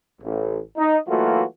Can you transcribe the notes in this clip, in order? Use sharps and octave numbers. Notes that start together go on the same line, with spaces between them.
A1
D#4
E3 F#3 A3 A#3 F4 F#4